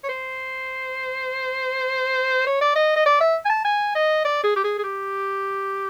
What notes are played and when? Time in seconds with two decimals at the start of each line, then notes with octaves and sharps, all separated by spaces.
0.04 C#5
0.09 C5
2.47 C#5
2.61 D5
2.76 D#5
2.96 D#5
3.06 D5
3.20 E5
3.45 G#5
3.50 A5
3.65 G#5
3.95 D#5
4.25 D5
4.44 G#4
4.56 G4
4.64 G#4
4.78 G#4
4.84 G4